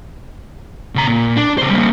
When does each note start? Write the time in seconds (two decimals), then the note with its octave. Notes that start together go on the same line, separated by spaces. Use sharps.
0.95 C#3 A#5
1.07 A#2
1.36 D4
1.58 C#3 C5
1.70 G3 A#3